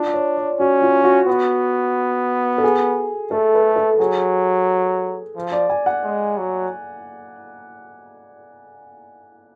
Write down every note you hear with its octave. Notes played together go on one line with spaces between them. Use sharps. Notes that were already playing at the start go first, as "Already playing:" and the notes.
Already playing: D4 F4
C#5
D5
C#4 F#4
F4
F#4
B3
A4
G#4
A3 A4
B4
A4
F#3 G#4
F3
D5
G#5
F#5
G#3
F#3